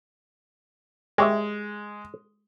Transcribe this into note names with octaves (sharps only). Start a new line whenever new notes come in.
G#3 G4 C#5 E5